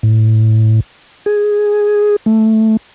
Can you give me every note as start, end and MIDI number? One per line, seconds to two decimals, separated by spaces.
0.03 0.80 45
1.26 2.16 68
2.26 2.77 57